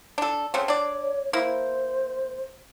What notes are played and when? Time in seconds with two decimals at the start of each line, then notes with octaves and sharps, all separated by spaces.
0.18 D4 A4
0.54 C#3 A3 C4 C#5
0.68 D4 D5
1.33 A#3 E4 C5